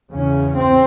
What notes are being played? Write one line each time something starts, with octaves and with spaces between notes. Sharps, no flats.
E2 C#3 C#4
C4